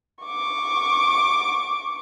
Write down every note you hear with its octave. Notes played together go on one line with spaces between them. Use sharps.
C#6 D6